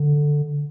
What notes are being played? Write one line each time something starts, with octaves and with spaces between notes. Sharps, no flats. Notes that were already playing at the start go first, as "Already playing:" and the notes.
Already playing: D3